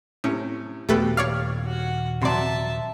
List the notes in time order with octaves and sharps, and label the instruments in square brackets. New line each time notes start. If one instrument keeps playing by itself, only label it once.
[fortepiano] A2 C3 [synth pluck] C#4
[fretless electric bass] D#1 [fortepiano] B2 G4 [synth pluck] A3 A4 B4
[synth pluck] C#5 D5 F5 [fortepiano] F6
[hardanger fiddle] F#4 F#5
[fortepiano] F2 F#3 C6 [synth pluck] C3 D5 [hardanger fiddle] E5 A5